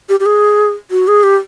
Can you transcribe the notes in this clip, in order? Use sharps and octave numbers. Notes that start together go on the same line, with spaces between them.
G4
G4
G#4
F#4
G#4
G4